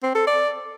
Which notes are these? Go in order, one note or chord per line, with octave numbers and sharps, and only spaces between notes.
C4
A4
D5